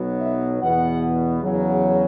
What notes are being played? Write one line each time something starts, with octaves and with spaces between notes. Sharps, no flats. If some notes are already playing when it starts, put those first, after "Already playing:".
Already playing: B1 B2 F#3 B3
E5
E2 B2 B3 F#5
E2 C#3 F#3